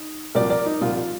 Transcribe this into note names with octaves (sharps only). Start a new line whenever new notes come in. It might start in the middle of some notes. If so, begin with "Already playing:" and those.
Already playing: D#4
C2 A#2 F3 A#4 D5
A#4 D5
D#4
C2 A#2 F3 F4
F4